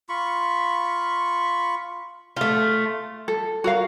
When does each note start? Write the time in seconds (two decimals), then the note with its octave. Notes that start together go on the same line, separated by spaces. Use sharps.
0.09 F4 B5 C#6
2.37 A3 F4
3.28 A4
3.64 F#4 A#4 F5